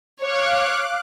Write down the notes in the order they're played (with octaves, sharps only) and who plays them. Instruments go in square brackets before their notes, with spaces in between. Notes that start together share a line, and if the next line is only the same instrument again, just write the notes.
[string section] C#5 [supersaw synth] F5 D6 F#6